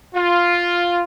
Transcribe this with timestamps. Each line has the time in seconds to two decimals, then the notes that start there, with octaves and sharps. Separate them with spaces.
0.15 F4